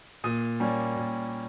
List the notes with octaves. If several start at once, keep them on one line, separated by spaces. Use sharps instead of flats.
A#2 D#6
G3 A#3 C#4
A#2